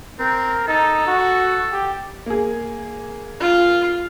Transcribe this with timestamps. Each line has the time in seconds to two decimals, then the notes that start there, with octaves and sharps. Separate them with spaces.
0.19 C4 A#4
0.68 D#4 A4
1.07 F#4
1.72 G4
2.26 A#3 G#4
3.40 F4